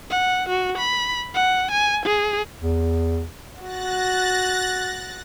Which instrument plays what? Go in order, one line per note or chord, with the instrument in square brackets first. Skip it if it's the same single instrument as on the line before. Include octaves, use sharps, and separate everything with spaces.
[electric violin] F#5
F#4
B5
F#5
G#5
G#4
[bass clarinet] E2
[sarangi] F#4 [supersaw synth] F#6 A6 A#6